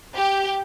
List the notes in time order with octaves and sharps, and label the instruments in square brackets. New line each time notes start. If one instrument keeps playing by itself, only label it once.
[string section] G4